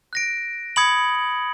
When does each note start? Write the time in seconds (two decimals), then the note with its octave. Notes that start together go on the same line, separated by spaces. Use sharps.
0.13 F#6 A#6 D7
0.76 B5 D#6 G#6 C#7 F#7